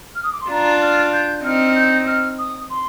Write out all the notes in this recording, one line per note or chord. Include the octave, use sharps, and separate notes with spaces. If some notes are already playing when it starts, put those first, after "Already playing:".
F6
D#6
D6
C6
D4 F4 A#5
F6
G6
C4 D#4 F6
G6
F6
D#6
C6